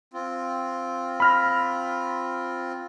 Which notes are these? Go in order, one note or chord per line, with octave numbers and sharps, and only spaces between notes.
C4 F4
B5 F6 A#6